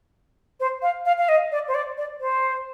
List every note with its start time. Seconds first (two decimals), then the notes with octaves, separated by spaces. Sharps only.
0.60 C5
0.82 F5
1.05 F5
1.18 F5
1.29 D#5
1.52 D5
1.68 C5
1.74 D5
1.97 D5
2.20 C5